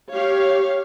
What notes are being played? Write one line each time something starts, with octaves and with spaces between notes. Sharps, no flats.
G4 C#5 F5